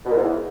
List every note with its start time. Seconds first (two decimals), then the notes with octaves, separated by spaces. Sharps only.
0.05 B2
0.11 A#2
0.16 G#2
0.22 E2